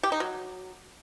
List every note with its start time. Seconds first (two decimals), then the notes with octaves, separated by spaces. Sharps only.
0.03 G4
0.12 D#4
0.20 F#3